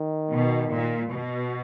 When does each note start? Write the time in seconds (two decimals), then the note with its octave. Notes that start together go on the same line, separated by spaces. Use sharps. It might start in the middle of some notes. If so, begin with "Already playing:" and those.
Already playing: D#3
0.31 B2
0.72 A#2
1.12 B2